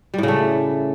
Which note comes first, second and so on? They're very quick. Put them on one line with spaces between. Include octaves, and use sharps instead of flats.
G3 A2 C#3 A3